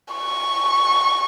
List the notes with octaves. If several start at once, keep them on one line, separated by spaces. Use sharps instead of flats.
C#6